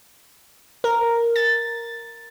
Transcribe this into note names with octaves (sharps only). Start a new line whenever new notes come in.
A#4
A6